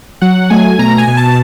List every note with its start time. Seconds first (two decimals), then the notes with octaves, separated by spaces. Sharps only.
0.21 F#3 F#5
0.50 A3 G#5
0.79 B2 A#5
0.98 G#5
1.07 B2
1.17 A5